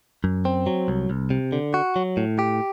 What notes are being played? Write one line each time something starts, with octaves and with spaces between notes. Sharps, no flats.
F#2
C4
F#3
C2
C2
C3
D3
F#4
F#3
A2
G4